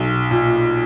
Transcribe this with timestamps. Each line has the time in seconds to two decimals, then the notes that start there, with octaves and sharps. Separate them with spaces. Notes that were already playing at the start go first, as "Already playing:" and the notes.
Already playing: B1
0.31 A#2